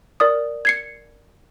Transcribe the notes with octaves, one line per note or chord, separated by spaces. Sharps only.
A#4 D5 D#6
G#6 C7 C#7